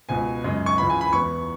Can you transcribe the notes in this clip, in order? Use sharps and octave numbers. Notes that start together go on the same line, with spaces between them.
C#2 B2 B3 G#5
F#2 C#3 G#3
C#6
C#2 C#3 E3 B5
G#5
B5
E2 E3 B3 C#6